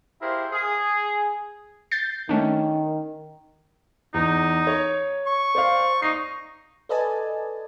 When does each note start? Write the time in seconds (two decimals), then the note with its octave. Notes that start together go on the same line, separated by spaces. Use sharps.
0.22 E4 G4 G#4 A#4 C5 F5
0.53 G#4
1.91 G6 A6 C7
2.29 D#3 A3 C#4 D4
4.14 E2 D#4
4.67 C#5
5.27 C#6
5.55 C5 D5 F5
6.02 D#4 C#6 C7
6.89 A4 B4 D5 D#5 G#5 A5